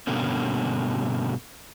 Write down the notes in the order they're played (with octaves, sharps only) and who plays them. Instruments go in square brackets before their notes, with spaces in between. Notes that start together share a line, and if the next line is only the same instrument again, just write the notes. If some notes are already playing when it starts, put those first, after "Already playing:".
[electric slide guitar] G2 B2 D3 A#3 C#4